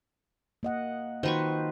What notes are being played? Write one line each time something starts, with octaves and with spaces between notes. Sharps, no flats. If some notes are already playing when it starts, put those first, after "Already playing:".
A#3 D#5 F#5
D#3 F4 F#4 B4 C5 C#6